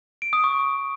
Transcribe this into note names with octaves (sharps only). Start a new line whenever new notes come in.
D7
D#6
C#6